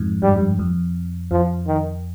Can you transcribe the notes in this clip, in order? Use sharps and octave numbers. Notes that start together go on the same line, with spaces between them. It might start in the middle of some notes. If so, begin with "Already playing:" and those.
Already playing: F2 G#2
G2 G3
F2
G2
F2
F2 F3
D#3